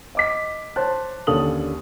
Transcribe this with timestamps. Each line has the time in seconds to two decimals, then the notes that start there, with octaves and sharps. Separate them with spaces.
0.15 D#5 D6 B6
0.76 C5 C#5 A5 F#6
1.27 D#2 D3 C#4 A4 D#6 F#7